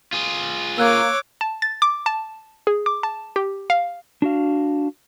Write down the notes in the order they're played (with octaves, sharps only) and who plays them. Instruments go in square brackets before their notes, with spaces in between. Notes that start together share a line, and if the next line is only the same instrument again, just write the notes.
[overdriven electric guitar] F4 G#4
[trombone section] A#3 [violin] C#5 D6 [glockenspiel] E6 F#6 G#6
[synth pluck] A5
A6
D6
A5
G#4
D6
A5
G4
F5
[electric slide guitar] D4 F#4 F5